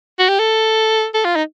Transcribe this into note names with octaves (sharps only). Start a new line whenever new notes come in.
F#4
G4
A4
A4
F4
D#4